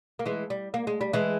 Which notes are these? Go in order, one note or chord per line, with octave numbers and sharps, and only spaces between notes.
A#3
E3 G#3
G3
A#3
G#3
G3
E3 G#3